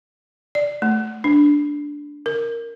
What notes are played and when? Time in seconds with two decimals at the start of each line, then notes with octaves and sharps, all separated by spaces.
0.55 D5
0.82 A3
1.24 D4
2.26 A#4